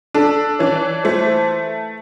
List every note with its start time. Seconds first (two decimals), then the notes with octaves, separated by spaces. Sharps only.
0.14 D4 A4
0.59 E3 C#5
1.04 A3 C5